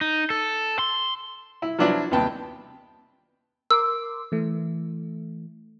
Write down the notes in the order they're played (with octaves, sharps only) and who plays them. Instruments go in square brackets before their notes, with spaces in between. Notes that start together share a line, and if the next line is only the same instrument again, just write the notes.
[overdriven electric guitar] D#4
A4
C6
[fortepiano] E4
F3 F#3 B3 D4 E4 F#4
D#2 C3 B3 G5 A5
[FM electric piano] A#4 C6 D6 [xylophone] E6
[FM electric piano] E3 A3